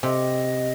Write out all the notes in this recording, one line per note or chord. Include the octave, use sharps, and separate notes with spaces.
C3 D#5